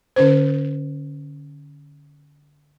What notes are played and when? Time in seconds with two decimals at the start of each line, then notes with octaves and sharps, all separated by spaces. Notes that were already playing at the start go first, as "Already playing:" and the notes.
0.16 D3 C#4 C5